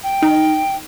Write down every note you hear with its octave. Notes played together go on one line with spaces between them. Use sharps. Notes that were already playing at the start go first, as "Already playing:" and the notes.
G5
D#4